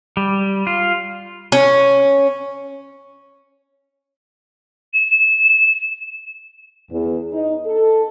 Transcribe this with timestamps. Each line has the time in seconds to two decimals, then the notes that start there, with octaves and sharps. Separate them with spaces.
0.17 G3
0.67 F4
1.52 C#4
4.94 E7
6.91 E2
7.32 D#4
7.66 A4